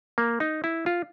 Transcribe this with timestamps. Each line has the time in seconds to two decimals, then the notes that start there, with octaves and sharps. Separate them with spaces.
0.18 A#3
0.40 D#4
0.64 E4
0.86 F4